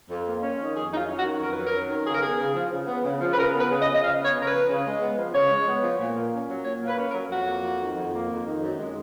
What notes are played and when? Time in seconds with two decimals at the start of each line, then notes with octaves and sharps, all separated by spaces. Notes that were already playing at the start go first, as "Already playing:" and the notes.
0.09 F2
0.26 A#3
0.41 C#4
0.58 D#3
0.74 F2 G#4
0.90 F#3 D#4
0.97 F4
1.08 C#4
1.18 F#4
1.23 D#3
1.40 F2 A#4
1.53 F#3 B4
1.66 A#4
1.72 C#4
1.89 D#3
2.05 C#3 G#4
2.13 A#4
2.21 B3 G#4
2.38 C#3
2.55 F3
2.71 C#3
2.87 B3
3.04 C#3
3.21 F3
3.32 B4
3.36 C#3 A#4
3.53 B3
3.59 B4
3.69 C#3
3.80 D#5
3.86 F3
3.93 D#5
4.02 C#3 F5
4.18 B3
4.24 C#5
4.36 C#3 A#4
4.46 F3 B4
4.68 C#3
4.85 G#3
5.00 B3
5.17 F3
5.33 C#3 C#5
5.50 G#3
5.67 B3
5.82 F3
5.99 A#2
6.15 A#3
6.32 C#4
6.48 F#3
6.64 A#2 C#5
6.81 A#3
6.87 B4
6.98 C#4
7.08 A#4
7.14 F#3
7.30 F2 F#4
7.46 A#3
7.63 F2
7.79 D#3
7.95 F2
8.13 A#3
8.29 F2
8.45 D#3
8.61 F#2
8.78 G#3